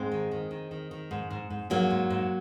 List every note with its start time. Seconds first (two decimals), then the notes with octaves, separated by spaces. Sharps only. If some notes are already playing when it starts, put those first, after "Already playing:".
Already playing: G#2 G#3 C4
0.12 D#3
0.31 D#3
0.51 D#3
0.71 D#3
0.91 D#3
1.11 G#2
1.30 G#2
1.50 G#2
1.70 G#2 F#3 A#3
1.90 G#2
2.10 G#2